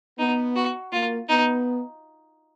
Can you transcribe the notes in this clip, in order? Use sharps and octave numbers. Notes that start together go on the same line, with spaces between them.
B3 D#4
F#4
A#3 F4
B3 D#4